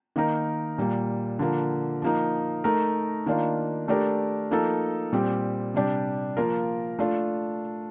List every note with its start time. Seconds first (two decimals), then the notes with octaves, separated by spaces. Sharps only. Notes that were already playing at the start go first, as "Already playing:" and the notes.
0.16 D#3 A#3 D#4 A#4
0.78 A#2 G3 A#3
1.39 D3 F3 A#3
2.02 F3 A#3 D#4
2.64 A3 D#4 A#4
3.26 D#3 A#3 D4 F4
3.88 A3 D4 G4 A#4
4.51 F3 A#3 D#4 A4
5.12 A#2 G3 C4 G4
5.74 C3 G3 D4 G4
6.37 F3 A#3 F4 A#4
6.99 A3 D4 F4